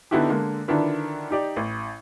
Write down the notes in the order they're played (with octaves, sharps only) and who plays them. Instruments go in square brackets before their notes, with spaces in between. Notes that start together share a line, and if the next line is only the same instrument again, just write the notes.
[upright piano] D3 B3 D#4 E4 F#4 G4
D3 G#3 A#3
D3 D#3 F3 D4 E4 B4
D#4 G4 D5
A1